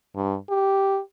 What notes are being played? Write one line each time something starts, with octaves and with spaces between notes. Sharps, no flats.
G2
G4